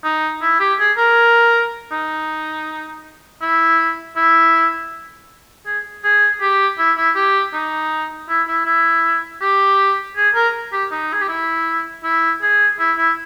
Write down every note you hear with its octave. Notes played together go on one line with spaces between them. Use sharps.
D#4
E4
G4
G#4
A#4
D#4
E4
E4
G#4
G#4
G4
E4
E4
G4
D#4
E4
E4
E4
G4
G#4
A#4
G4
D#4
G#4
G4
E4
E4
G#4
E4
E4